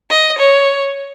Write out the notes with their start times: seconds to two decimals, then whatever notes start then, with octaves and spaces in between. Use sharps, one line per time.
0.10 D#5
0.39 C#5